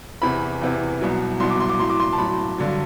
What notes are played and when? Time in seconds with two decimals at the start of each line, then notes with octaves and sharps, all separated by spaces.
0.22 E2 C3 E3 B5
0.62 E2 C3 E3
1.01 C2 B2 F#3
1.40 C2 B2 F#3 C6
1.50 D6
1.60 C6
1.69 D6
1.79 A2 F#3 C6
1.90 D6
2.00 C6
2.13 A5
2.18 A2 F#3 B5
2.58 G2 D3 F#3